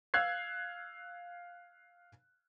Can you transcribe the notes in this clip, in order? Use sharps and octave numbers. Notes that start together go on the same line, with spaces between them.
F5 E6 F#6 G#6 C7